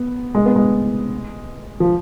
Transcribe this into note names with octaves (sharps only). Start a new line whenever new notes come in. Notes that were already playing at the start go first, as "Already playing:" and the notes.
Already playing: B3
G#3
B3
G#3
F3